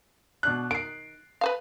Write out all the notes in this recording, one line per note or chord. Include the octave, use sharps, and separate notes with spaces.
B2 D4 F#6
D#3 C7 D7
B4 C5 F5